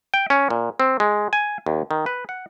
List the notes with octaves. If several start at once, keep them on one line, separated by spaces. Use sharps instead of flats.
G5
C#4
A#2
C4
G#3
G#5
D#2
D#3
B4
F#5